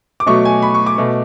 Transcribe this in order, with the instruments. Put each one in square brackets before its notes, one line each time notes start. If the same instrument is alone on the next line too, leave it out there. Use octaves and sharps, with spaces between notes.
[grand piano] D6
B2 F#3 A3 C#6
G#5
B5
C#6
D6
B2 A3